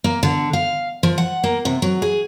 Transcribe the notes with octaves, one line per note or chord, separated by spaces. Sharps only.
A#3
D3
F5
F3
F#5
A#3
C3
F#3
G#4